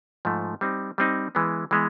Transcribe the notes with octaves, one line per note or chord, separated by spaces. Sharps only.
G#2 F3 A3
G3 C4 D#4
G3 C4 D#4
E3 G#3 B3
E3 G#3 B3